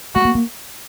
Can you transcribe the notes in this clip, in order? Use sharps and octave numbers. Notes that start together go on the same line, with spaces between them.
A3 F#4
A#3
A#3